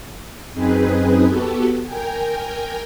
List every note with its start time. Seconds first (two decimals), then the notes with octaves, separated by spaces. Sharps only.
0.53 F#2 C4 D#4 G#4 B4
1.27 B3 F#4 G4 A4
1.84 A#4 G5 G#5